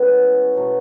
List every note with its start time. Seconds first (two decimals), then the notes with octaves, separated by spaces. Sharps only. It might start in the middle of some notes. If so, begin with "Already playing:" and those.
Already playing: A2 E3 G#3 B3 C#4 E4
0.54 B2 F#3 A3